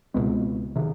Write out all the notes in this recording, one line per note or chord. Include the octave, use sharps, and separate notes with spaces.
C#2 B2 G#3 B3
C3 D#3